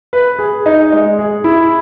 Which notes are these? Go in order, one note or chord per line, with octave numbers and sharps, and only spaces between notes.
B4
G#4
D#4
G#3
G#4
E4